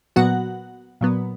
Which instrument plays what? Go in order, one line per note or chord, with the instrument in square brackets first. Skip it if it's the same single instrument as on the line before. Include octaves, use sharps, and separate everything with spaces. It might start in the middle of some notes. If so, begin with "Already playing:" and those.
[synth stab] A#2 F#3 B3 F#4 F#5
A#2 F#3 B3